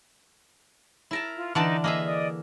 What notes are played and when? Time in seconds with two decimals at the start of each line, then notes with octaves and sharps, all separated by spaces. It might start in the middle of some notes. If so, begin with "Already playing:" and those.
1.11 E4 A#4 A5
1.36 F4
1.55 D3 E3 D#4 D5 A5
1.84 A#3 G#4 D#5 E5
2.05 D5 D#5 D#6